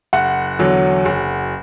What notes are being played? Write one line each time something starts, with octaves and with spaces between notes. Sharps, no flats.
F#1 F#5
E2 D3 F#3
F#1